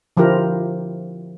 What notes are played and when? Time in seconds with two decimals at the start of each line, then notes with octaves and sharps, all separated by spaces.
0.17 D3 F3 E4 G4 A#4 C5